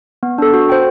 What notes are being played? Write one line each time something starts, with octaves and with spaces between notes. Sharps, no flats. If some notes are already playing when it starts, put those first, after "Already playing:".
B3
D4 A4
F#4
C5 G5